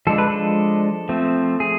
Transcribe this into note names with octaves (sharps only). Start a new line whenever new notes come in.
F3 G#3 D4 A4
B4
A4
F3 A3 C4
G#4